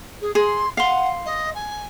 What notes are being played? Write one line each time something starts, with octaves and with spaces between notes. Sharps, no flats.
G#4
G#4 C6
F5 F#5 C6
D#5
G#5